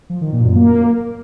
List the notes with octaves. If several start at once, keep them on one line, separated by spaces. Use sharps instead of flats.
F3
D#3
A#2
F#2
A#3